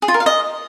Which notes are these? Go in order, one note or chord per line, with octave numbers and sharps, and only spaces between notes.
G#4
F4
A#4
F5
D#5